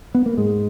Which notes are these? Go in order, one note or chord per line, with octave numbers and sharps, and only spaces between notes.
B3
A#3
G#2 G#3